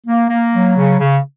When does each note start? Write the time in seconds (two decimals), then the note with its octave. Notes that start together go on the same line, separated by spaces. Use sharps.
0.07 A#3
0.30 A#3
0.53 F#3
0.76 C#3
1.00 C#3